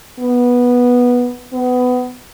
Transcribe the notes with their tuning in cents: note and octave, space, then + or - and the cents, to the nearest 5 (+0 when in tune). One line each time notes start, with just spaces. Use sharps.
B3 -10
B3 +20